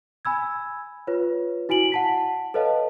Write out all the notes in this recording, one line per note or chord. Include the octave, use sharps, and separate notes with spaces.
G#5 B5 E6 G#6
F4 B4 C#5
E4 F#4 G#5 D7 F#7
F#5 A5 B6
A4 B4 C#5 D#5 F5 A5